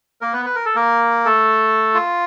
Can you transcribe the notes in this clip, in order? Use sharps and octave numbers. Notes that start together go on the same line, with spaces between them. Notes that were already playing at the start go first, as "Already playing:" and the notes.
A#3 A#4
B3 B4
B4
A#4
A4
A#3 A#4
A3 A4
F4